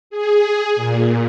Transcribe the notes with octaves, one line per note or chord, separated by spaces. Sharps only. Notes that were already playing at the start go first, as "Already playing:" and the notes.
G#4
A#2